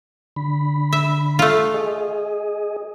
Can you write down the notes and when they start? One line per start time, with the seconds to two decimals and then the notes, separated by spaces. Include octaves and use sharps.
0.36 D3 B5
0.92 E5
1.39 A3 F4
1.74 G#4 D#5